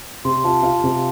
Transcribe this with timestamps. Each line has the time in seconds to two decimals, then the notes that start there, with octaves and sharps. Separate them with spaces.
0.25 C3 C6
0.35 C6
0.44 F4 A5
0.63 F4 F5
0.84 C3